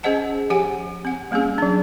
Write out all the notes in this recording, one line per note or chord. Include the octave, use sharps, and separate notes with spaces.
C#4 G#4 C5 D#5 F#5 A5
F3 G4 F#5 G#5
C4 F#5
G3 A#3 C4 C#4 G#4
F#3 D4